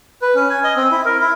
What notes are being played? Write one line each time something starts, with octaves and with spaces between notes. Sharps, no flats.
B4
C#4
G#5
D#5
C4
E4
A#4
E4